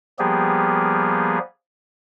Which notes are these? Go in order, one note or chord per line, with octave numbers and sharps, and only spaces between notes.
F3 G3 A#3 B3 G4 G#4